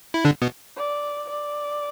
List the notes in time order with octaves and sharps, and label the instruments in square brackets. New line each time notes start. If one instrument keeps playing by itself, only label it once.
[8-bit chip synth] E4
D3 D4
B2 B3
[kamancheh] D5
D5